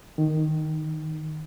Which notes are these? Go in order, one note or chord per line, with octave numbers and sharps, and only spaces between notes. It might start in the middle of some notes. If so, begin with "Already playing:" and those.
D#3